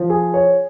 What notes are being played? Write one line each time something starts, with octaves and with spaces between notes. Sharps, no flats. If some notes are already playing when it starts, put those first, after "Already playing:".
Already playing: F3
G#4
C#5